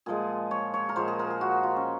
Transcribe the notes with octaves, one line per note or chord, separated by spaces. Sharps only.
A#2 F3 G#3 G#4
C#5
C#5
A#4
A#2 F3 G#3 C5
G#4
A#4
G#4
F#4
F4
C#4